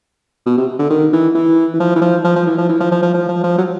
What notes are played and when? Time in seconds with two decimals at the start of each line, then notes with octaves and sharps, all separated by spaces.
0.46 B2
0.57 C3
0.79 D3
0.90 D#3
1.13 E3
1.35 E3
1.74 E3
1.80 F3
1.96 E3
2.02 F3
2.24 F3
2.36 F3
2.46 E3
2.58 F3
2.69 E3
2.80 F3
2.92 F3
3.02 F3
3.14 F3
3.29 F3
3.43 F3
3.58 F#3